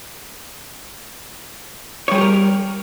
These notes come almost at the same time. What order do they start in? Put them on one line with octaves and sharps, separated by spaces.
C#5 G3 G#4 G4 A#4